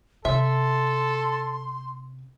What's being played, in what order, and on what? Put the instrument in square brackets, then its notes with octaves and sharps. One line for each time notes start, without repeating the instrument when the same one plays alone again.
[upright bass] C3 [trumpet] A4 [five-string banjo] E5 [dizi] C6